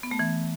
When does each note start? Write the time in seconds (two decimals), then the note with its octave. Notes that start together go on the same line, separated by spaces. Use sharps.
0.03 B3
0.11 A3
0.19 E3